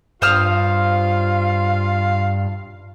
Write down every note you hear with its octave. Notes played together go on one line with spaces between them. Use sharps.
G2 F4 C5 F5 D#6 F6